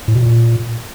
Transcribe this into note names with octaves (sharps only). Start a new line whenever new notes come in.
A2
B2
A#2